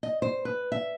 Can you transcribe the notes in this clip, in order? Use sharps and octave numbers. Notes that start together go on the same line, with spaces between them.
D#5
C5
B4
E5